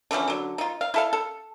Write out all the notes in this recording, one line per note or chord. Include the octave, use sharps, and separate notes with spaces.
D3 E3 F3 C#4
D3 F#3
D#4 F4
F5
E4 A4 F5
A4